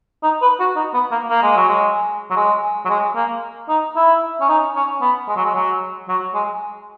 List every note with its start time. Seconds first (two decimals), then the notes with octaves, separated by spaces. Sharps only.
0.23 D#4
0.42 B4
0.60 F#4
0.76 D#4
0.94 B3
1.12 A#3
1.30 A#3
1.42 G#3
1.57 F#3
1.68 G#3
2.30 F#3
2.36 G#3
2.85 F#3
2.89 G#3
3.16 A#3
3.69 D#4
3.96 E4
4.41 C#4
4.49 D#4
4.76 C#4
5.01 B3
5.28 G#3
5.36 F#3
5.45 G#3
5.55 F#3
6.08 F#3
6.34 G#3